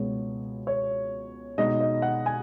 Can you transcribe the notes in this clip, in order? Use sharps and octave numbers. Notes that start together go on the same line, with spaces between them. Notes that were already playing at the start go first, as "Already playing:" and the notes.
Already playing: C#2 B2 G#3 B3 C#5
C#5
B2 G#3 D#4 D#5
D#5
F#5
G#5